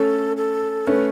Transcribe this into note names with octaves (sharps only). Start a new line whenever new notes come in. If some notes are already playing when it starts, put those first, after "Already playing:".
Already playing: A3 C#4 A4
A4
A3 C#4 B4